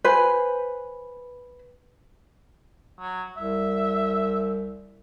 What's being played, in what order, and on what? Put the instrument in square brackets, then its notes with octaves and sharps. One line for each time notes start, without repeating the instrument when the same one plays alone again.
[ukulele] B4 C5 G#5
[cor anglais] F#3
[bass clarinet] C2 [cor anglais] E5